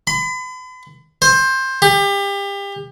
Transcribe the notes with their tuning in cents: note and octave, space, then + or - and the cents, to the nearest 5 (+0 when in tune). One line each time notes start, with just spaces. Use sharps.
B5 +40
C5 +15
G4 +30